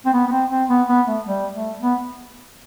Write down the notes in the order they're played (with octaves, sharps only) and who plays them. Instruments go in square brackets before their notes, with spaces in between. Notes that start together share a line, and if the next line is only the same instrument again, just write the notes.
[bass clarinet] C4
B3
B3
C4
C4
B3
B3
A3
G3
A3
B3